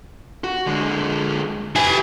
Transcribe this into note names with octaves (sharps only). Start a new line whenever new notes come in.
F#4
D3 G#3
E4 G4 B4 G#5